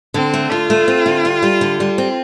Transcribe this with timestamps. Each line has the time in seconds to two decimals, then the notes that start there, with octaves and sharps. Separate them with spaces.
0.14 D3 C4
0.34 A3
0.51 D3 F4
0.70 A3
0.88 C4
1.06 D3
1.25 G3
1.42 G3
1.61 D3
1.80 G3
1.98 C4